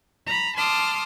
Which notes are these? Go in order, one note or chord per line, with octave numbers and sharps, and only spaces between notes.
A#5 B5
A5 C6 D6 D#6 F6